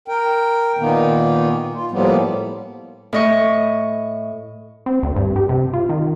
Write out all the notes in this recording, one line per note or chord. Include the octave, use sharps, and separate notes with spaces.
A#4 G5
A#2 D#3 A#3 B3
F4
A2 F3 G3 A#3 B3
A2 D#5 C#6
C4
D2
G2
G4
C3
F4
D#3